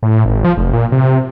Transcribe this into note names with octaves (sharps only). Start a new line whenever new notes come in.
A2
G#1
F3
F1
A#2
C3